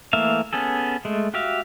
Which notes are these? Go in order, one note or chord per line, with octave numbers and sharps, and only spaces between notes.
E3 A3 A#3 E5 F5
B3 C#4 G#4 A4
G#3 A3
F#4 G4 E5 F5